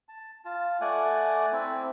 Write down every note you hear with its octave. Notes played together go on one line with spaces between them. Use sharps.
A5
F4 A5
A3 D5 F#5 G#5
C4 E4